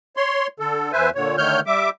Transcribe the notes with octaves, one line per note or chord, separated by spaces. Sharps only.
C#5 C6
D3 A4
E2 B4 C5 E5 G#5
A#2 D3 C#5
D3 D#3 A3 C#5 F6 G6
G3 E5 D6